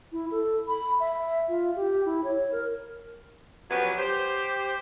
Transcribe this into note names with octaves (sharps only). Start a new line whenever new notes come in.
E4
A4
B5
E5
F4
G4
E4
C#5
A#4
F3 F#3 B3 C#4 G4 B4
G4 C5